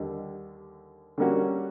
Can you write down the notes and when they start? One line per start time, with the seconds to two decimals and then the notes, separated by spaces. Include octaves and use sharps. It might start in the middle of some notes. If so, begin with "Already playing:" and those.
Already playing: D#2 D3 G3
1.18 D3 G3 A#3 C#4 F#4